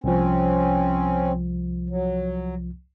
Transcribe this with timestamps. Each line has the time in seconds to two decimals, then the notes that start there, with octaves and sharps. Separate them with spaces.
0.04 C2 F3 C4 C#4
1.90 F#3